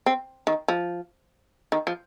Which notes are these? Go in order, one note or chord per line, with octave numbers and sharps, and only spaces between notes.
C4
D#3
F3
D#3
F3